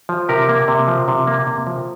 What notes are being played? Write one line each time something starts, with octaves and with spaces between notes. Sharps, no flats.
F3
C3 G4 A#4
A#3
C3
F3
C3
A#3
C3
F3